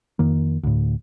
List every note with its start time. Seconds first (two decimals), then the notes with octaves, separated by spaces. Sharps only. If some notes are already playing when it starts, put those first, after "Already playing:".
0.19 F2 D#3 A#3
0.63 D2 A2